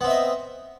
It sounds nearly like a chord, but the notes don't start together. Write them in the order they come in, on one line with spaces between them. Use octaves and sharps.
B3 C4 E5 D#5